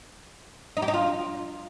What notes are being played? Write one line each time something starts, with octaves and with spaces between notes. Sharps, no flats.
D#4
G4
D#4
F4